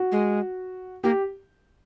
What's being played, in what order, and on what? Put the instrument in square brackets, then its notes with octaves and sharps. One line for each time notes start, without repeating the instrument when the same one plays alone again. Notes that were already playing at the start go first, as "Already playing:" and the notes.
Already playing: [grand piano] F#4
[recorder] G#3
[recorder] A#3 [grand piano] G4